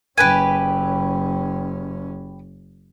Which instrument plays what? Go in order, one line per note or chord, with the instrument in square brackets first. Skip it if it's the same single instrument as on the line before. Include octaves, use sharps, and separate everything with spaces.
[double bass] F#1 C#4 [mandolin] G4 B4 G#5